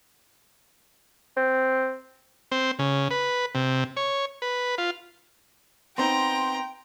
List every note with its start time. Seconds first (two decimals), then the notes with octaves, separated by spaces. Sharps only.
1.37 C4
2.52 C4
2.79 C#3
3.11 B4
3.55 C3
3.97 C#5
4.42 B4
4.78 F4
5.98 B3 C4 D#4 G5 A#5 C6